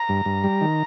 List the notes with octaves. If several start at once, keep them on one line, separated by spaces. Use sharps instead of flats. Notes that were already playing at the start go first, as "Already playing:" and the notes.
Already playing: A#5
G2
G2
G3
D#3